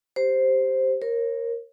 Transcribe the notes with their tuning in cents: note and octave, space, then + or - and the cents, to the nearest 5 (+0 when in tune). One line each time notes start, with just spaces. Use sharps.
G4 +0 C5 +0
A#4 +0 C#5 -35